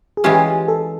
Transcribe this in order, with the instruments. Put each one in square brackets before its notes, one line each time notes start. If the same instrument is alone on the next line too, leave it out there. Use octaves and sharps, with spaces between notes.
[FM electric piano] G#4
[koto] E3 G#3 C#4 F4 [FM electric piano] G4
[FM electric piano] A4